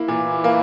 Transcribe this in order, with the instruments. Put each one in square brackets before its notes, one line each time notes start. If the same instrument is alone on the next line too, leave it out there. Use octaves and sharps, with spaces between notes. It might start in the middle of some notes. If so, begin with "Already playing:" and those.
Already playing: [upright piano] A#3 E4
[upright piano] A#2 [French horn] E3
[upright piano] A#3